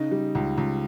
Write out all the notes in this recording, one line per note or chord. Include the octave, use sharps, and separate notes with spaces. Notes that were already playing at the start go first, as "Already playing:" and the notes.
Already playing: C#3 D#4
G3
C#2
C#2